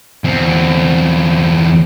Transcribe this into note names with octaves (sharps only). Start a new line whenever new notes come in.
E2 C4